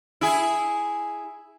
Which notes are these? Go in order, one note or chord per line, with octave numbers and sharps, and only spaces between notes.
E4 G#4